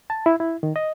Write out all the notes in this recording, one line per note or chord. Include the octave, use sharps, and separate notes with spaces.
A5
E4
E4
D#3
D#5